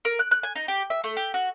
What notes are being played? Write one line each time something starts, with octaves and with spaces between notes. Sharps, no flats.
A#4
F#6
F#6
G#5
D#4
G4
E5
A3
G4
F#4